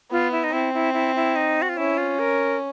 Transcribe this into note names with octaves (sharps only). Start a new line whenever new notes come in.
B3 F4
E4
D#4
C4 E4
E4
E4
E4
D#4
F#4
F4
C#4 E4
F4
A#4